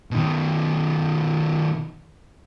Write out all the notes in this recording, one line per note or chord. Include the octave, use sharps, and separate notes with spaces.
B2 D#3